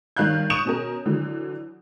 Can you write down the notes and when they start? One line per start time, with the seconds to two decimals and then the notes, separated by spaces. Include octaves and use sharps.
0.17 G2 D#3 C#5 F5 F#6 G6
0.50 C#6 D#6 E7
0.65 B2 C#4 A#4
1.06 D3 E3 F#3